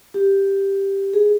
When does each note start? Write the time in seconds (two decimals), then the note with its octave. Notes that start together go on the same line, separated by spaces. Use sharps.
0.14 G4
1.14 G#4